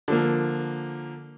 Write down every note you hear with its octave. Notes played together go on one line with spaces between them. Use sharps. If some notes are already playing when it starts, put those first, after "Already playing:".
D3 F3 A#3